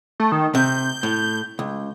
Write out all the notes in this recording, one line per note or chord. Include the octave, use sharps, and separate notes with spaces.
A3
D#3
C3 G6
A2
C#2